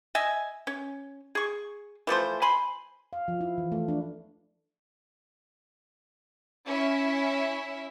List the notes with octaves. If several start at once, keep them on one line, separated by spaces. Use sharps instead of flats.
D#5 E5 G#5
C#4
G#4 C#6
E3 F3 A3 C5
G#5 B5 C6
F5
F3
E4
E3
A3
D4
C#4 E4 E5